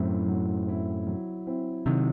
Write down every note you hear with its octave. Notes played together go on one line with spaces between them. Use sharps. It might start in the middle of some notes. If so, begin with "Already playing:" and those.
Already playing: F#2 A2 F#3 C4 E4
F#3
C4 E4
F#3
C4 E4
C3 D#3 F#3